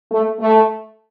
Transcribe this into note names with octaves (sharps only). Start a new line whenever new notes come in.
A3
A3